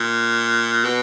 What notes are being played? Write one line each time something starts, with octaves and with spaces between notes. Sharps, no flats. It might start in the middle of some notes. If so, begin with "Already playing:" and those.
Already playing: A#2
B2